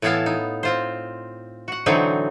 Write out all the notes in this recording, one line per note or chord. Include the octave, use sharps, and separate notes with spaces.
A2 E3 B3 E4 F5 A5
D#4
C4 F4 C5
F#4 F#5
D3 E3 F#3 C4 D#4